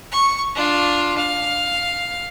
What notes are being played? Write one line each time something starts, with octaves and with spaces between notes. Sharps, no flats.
C#6
D4 F4
F5